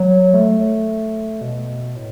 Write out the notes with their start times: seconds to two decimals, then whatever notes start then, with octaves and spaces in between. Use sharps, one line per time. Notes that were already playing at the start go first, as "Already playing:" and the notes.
Already playing: F#3
0.34 A3
1.41 B2
1.96 A2